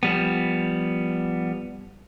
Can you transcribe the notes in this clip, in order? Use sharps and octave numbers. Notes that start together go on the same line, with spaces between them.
F3 G3 B3